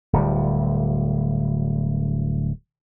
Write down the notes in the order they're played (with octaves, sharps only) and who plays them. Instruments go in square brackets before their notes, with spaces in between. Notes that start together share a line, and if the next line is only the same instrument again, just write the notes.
[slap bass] D1 D2 G3